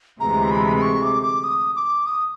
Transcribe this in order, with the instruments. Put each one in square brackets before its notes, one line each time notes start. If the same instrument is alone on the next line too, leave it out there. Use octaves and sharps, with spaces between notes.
[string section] D2 C3 E3 G#3 [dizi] A#5
[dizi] B5
C#6
D6
D6
D#6
D6
D#6